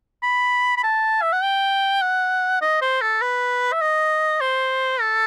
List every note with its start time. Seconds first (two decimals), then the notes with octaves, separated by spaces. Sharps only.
0.23 B5
0.78 B5
0.84 A5
1.22 E5
1.33 F#5
1.43 G5
2.02 F#5
2.62 D#5
2.82 C5
3.02 A4
3.22 B4
3.73 E5
3.82 D#5
4.41 C5
5.01 A4